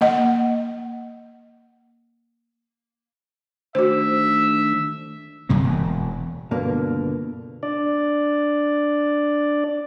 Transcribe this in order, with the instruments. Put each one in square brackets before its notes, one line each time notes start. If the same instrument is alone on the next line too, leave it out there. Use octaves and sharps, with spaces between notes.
[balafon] A#3 D#5 F#5
[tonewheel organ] D#3 A3 D4 [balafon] F#4 C5 [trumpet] E5
[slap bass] C2 F#2 C3 A#3
E1
[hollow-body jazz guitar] C#2 G2 B2 D3 A#3 D5
[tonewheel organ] D4 D5